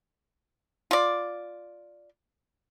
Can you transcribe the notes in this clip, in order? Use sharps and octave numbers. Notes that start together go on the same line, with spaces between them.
F4 D5